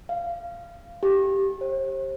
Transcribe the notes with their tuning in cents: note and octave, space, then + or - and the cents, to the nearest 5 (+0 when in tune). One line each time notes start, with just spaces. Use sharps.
F5 -20
G4 -5
C5 +40